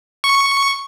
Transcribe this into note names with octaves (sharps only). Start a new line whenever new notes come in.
C#6